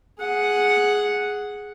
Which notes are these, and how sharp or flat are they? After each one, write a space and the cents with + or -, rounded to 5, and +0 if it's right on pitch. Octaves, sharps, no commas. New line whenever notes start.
G#4 +0 F#5 +0